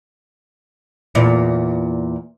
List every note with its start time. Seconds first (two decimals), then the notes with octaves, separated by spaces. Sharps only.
1.15 E2 A#2